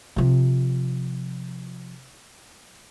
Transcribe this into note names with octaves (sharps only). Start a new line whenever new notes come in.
C3 F3